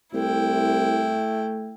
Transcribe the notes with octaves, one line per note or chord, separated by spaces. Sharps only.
C2 A3 E4 G5